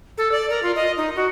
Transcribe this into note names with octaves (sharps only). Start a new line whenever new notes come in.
A4
D5
A#4
F4
D#5
D#4
F#4